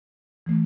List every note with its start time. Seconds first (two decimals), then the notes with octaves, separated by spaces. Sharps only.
0.46 E3 A3